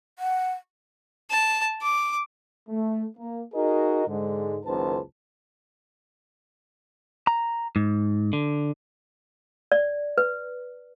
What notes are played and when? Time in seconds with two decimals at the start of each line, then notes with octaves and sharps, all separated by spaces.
0.19 F#5
1.31 A5
1.82 D6
2.69 A3
3.17 A#3
3.54 D#4 F#4 G#4 A#4 D#5
4.07 G#2 D3 G#3
4.65 F#1 C#2 D#3 B4 C5 A5
7.27 A#5
7.76 G#2
8.33 D3
9.72 D5
10.18 B4